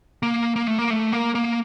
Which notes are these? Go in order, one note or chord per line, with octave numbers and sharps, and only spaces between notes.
A#3
A#3
A3
A#3
A3
A#3
A#3